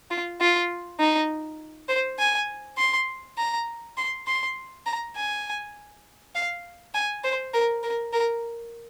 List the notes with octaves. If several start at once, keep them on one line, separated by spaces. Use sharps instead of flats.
F4
F4
D#4
C5
G#5
C6
A#5
C6
C6
A#5
G#5
F5
G#5
C5
A#4
A#4
A#4